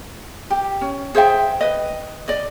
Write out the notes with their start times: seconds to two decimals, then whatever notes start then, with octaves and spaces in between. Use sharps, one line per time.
0.50 G4
0.81 C#4
1.15 G#4 C5 E5 G5
1.61 B4 D#5
2.28 D5 D#5